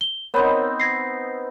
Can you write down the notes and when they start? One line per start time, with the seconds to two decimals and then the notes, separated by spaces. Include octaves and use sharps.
0.01 G7
0.34 B3 C4 D#4 A#4 C#5 B5
0.80 G#6 A#6 C7